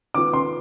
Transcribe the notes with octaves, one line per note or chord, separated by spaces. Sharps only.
D#3 B3 F4 D6
C6